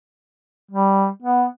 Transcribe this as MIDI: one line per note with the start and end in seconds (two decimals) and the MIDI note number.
0.71 1.09 55
1.23 1.45 59